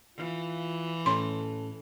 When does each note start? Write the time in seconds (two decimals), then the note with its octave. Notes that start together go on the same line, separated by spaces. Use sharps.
0.18 E3 F4
1.06 A2 C#4 A4 C6